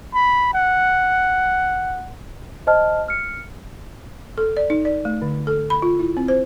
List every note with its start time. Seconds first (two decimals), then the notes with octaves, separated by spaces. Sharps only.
0.14 B5
0.54 F#5
2.67 C5 D#5 A5 F6
3.08 F6 C#7
4.38 A4
4.57 D5
4.70 D#4
4.85 D5
5.05 A3
5.22 D3
5.47 A4
5.70 B5
5.82 F4
6.00 E4
6.17 C4
6.28 C5